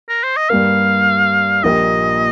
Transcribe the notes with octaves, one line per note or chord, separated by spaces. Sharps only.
A#4
C5
D#5
G2 G3 A#3 F5
A#1 A#2 A#3 G4 D#5